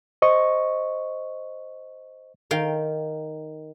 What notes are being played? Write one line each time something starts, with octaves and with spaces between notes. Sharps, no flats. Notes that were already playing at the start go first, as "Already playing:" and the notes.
C5 D#5 C#6
D#3 F5 G5